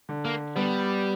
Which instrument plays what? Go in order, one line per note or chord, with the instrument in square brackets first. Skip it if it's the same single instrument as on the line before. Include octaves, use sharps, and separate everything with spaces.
[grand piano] D3
[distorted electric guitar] A#3
[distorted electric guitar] G3 [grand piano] B3